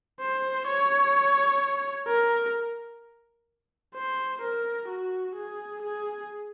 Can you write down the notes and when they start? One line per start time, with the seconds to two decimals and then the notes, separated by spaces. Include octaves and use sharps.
0.20 C5
0.67 C#5
2.07 A#4
3.95 C5
4.41 A#4
4.88 F#4
5.35 G#4
5.82 G#4